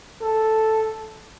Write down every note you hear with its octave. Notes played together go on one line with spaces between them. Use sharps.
A4